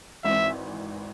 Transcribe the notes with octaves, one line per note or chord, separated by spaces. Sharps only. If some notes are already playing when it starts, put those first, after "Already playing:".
G#1 G#2 E3 C4 E5